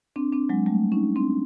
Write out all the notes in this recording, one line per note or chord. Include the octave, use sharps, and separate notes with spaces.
C4 D4
C4 D4
F#3 G#3
G3 A3
C#4 D#4
C4 D4